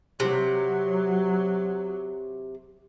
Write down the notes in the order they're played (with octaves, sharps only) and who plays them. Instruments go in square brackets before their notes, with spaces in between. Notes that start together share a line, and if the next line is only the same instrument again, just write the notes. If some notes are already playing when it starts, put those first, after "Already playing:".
[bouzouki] C3 [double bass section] F#3